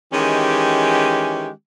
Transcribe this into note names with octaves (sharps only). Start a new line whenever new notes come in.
D#3 E3 G#3 C#4 G4